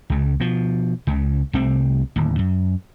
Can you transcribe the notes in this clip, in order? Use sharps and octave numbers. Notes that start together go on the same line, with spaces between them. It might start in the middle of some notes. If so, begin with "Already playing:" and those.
C#2 C#3
B2 F3
C#2 C#3
C2 C3 A3 C4
D1 D#2
F#2